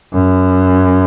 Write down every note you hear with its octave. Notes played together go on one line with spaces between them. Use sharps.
F#2